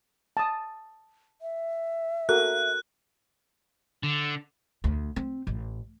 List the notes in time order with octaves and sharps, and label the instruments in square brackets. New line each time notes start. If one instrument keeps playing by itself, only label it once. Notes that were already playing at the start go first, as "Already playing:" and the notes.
[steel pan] A5 D#6
[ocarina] E5
[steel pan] F#4 A4 A#4 [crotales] F#6
[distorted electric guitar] D3
[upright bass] D2
C4
A1